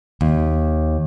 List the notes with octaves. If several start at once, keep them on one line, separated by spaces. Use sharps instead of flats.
D#2